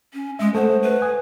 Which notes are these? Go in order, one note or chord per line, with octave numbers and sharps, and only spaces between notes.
C#4
G#3 E5 D#6
A3 A4 C5 F#5
B4
G#5 D#6